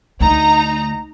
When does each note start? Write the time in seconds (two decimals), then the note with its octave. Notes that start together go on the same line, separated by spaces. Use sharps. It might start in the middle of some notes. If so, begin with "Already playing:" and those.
0.20 D2 D#4 A#5